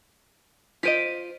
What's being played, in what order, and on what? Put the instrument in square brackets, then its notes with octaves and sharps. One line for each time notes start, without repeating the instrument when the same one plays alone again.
[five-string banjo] F4 C5 D#5 [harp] B6 D7 D#7